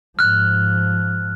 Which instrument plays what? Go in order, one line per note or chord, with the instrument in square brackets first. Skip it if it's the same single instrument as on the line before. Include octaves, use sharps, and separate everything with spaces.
[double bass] G#2 F3 [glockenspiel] F6 F#6